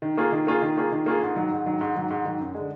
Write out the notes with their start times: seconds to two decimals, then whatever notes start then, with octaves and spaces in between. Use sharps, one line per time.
0.02 D#3
0.17 A#3 F4 G#4
0.32 D#3
0.47 A#3 F4 G#4
0.62 D#3
0.77 A#3 F4 G#4
0.92 D#3
1.06 A#3 F4 G#4
1.22 G#2
1.36 D#3 F#3
1.51 G#2
1.66 D#3 F#3
1.81 G#2
1.95 D#3 F#3
2.10 G#2
2.25 D#3 F#3
2.40 F#2
2.55 D3 G#3